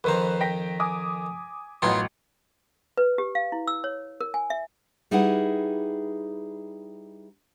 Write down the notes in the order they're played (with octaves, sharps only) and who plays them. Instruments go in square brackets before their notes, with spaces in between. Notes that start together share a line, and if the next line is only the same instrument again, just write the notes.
[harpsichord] F2 D#3 A#5 [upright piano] B4 C5
[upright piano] G5 A#6 B6
G#5 D6 D#6
[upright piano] A1 F#2 D#5 [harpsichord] B3 D#4 F4
[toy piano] B4
G4
F5
E4
E6
C#5
A#4
G#5
E5
[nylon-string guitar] G3 D#4 E4 G#4 B4 F#5